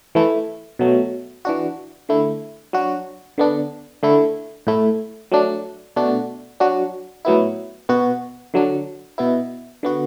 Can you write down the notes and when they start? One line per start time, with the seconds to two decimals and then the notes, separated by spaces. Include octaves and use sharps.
0.15 E3 A3 E4
0.79 B2 F#3 A3
1.45 E3 D4 F#4
2.09 D3 A3 E4
2.73 F#3 D4 F#4
3.38 D3 B3 D4
4.03 D3 A3 E4
4.67 A2 A3 E4
5.32 F#3 A3 D4
5.96 B2 A3 D4 F#4
6.60 F#3 D4 F#4
7.25 A2 F#3 B3 E4
7.89 B2 B3 F#4
8.54 D3 F#3 D4
9.18 B2 B3 E4
9.83 D3 B3 F#4